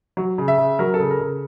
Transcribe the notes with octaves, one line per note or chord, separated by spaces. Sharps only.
F#3
C#3
E5
C#3
F#3 A#4
A4
C#3
A#4
C#3